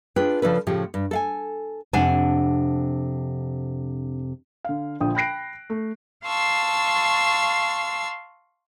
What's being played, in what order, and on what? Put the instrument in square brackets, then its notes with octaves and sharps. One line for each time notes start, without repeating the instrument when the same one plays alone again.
[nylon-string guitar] D4 F4 G#4 B4 G5
C#3 F3 D4 A4 B4
A2 C#3 F3 G4
G2
A4 F5 G#5
[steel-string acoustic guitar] F2 C3 [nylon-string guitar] D4 F#5 G#5
[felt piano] D3 F5
A#1 D3 F3 G5 D#6
G5 B5 F#6 A#6 C7 D7
A3
[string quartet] F5 A5 C6 C#6 E6